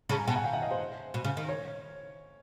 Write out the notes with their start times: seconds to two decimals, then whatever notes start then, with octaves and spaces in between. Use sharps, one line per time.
0.09 C#3 A5 B5
0.18 G#5 A#5
0.27 B2 G5 A5
0.36 F#5 G#5
0.44 F5 G5
0.53 E5 F#5
0.62 D#5 F5
0.71 C5
1.14 B2
1.25 C#3
1.37 D#3
1.49 C#5